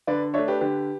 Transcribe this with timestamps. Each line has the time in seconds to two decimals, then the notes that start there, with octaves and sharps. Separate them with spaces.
0.07 D3 B4 D5
0.34 A3 D4 C#5 E5
0.48 G4 B4
0.61 D3 G4 B4